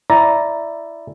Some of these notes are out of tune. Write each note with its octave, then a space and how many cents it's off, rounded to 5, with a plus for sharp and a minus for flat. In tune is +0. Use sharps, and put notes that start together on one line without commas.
E4 +5 D5 +0 A#5 +5